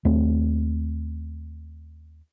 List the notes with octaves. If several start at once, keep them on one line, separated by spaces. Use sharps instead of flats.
D#2 A3 C4